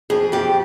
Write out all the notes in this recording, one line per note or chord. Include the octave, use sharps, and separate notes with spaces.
F2 G#4
F2 G4